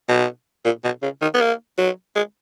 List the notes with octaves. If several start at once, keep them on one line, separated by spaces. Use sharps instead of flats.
B2
A#2
B2
C#3
D#3
B3
A#3
F#3
G#3